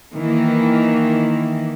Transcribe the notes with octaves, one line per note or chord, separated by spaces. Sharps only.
D#3 E3 A#3